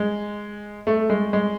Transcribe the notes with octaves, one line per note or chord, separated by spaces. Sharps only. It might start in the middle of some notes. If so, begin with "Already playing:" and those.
Already playing: G#3
A3
G#3
G#3